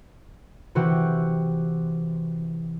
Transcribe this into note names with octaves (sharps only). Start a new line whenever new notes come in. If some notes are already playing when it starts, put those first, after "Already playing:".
C3 E3 F#4 G4